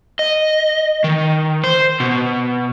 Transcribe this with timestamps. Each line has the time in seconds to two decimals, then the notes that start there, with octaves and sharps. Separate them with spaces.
0.19 D#5
1.04 D#3
1.64 C5
2.00 B2